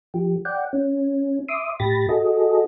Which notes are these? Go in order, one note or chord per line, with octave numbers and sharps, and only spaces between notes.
F3 G4
D5 F#5 G5
C#4
E5 C6 D6 D#6
A2 G4 B5 A6 A#6
F#4 G#4 A4 D#5